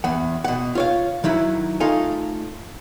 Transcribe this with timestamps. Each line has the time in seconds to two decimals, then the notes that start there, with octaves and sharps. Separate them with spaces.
0.04 E2 F#5
0.44 B2 F#5
0.75 F4 C#5 F5
1.24 D#3 F#3 E4 F#4
1.80 A3 D#4 F4 A4 F5 G#5